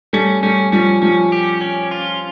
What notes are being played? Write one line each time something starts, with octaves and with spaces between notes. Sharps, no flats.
G3 A3 C#4
G3 A3 C#4
F3 G3 C#4
F3 G3 C#4
G4
C#4
F4